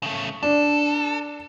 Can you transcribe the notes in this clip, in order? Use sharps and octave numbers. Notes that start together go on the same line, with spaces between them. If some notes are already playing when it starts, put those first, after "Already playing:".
C#3 A3
D4 A4